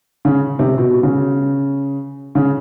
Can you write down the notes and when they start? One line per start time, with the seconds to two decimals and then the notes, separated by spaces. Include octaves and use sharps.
0.25 C#3
0.59 C3
0.78 B2
1.03 C#3
2.35 C#3